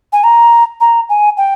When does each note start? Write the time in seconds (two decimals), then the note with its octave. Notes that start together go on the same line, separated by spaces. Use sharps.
0.12 G#5
0.23 A#5
0.80 A#5
1.09 G#5
1.37 G5